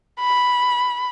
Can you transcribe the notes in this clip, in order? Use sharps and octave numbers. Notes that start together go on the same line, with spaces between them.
B5